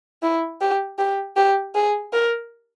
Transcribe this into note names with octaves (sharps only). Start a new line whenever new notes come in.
E4
G4
G4
G4
G#4
A#4